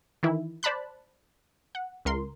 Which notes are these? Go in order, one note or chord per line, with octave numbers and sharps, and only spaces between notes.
D#3 E3 E4
C5 D5 A5 B5 F#6
F#5
C#2 A#4 C6